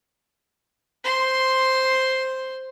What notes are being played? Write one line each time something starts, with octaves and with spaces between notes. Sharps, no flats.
C5 C6